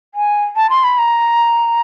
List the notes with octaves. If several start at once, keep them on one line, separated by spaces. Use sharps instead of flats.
G#5
A5
C6
B5
A#5